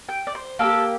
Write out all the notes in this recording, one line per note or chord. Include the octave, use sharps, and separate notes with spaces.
G5
D5
C5
A#3 D4 G4 A4